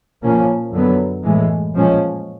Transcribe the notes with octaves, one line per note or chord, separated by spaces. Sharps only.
A#2 F3 A#3 C#4
F#2 D3 F#3 B3
A2 E3 G#3
A#2 F3 G#3 C#4